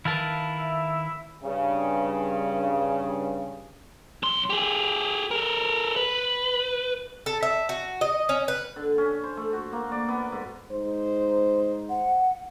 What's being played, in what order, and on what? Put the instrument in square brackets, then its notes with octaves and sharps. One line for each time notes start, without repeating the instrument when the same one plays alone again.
[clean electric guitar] D#3 A#4 B4 [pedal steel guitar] E4 F5 A5
[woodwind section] E5
[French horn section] G2 C#3
[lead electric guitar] B1 C6
G4 G#4
A4 A#4
B4
[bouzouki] A4
E5
F#4
D#5
C#4
B4
[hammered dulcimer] D3
C#4
C5
A3
F#4
A#3
D5
B3
G#2
[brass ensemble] G#2 D#4 C5
[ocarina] F#5